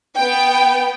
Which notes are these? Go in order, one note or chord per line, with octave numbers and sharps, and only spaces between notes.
B3 G5